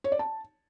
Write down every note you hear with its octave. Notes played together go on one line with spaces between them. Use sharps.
C#5
D5
A5